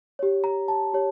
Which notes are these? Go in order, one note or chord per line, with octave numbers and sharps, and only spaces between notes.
G4 C#5
A#5
A5
G4 C#5